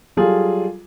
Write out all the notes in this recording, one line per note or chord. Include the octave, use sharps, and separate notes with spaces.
F#3 G3 F4 G#4 A4